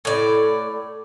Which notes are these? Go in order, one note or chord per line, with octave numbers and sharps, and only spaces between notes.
A2 D5